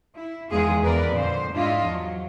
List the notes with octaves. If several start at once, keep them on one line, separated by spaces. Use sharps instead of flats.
E4
E2 D#3 G#3 F4 G#4
E2 A#4 B4 D5
F2 A#2 D3 C5
G#2 D4 E4 F4 D#5
E2 F3 F#3